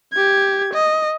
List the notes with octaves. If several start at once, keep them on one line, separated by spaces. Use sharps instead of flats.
G4 G#6
D#5